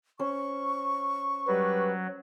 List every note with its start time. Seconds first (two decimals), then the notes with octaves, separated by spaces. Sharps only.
0.20 C#4 C5 C#6
1.47 F#3 G3 B4